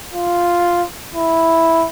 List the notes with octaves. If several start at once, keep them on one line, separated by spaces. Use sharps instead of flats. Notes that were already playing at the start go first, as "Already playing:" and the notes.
F4
E4